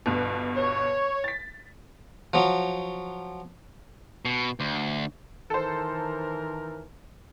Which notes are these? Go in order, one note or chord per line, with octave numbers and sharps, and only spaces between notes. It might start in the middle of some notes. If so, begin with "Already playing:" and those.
G1 G2 B2
C#5
A6 B6
F3 F#3
B2
D2
D#3 E3 A4 A#4 C5